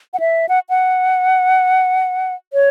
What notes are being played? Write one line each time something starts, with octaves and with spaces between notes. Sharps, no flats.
F#5
E5
F#5
F#5
C#5